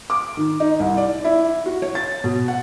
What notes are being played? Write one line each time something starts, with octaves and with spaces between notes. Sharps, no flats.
D6
D#3
D#4
C2
D5
E4
F#4
C#5
A6
B2
F#5